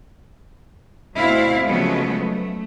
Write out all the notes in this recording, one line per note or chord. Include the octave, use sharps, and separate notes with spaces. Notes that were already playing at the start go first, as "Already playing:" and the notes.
D2 B2 C4 E4 F5
C#3 F3 F#3 G#3 A3 B3
A3